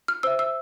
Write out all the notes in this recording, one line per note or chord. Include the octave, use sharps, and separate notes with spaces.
F6
C5 E5 E6
E6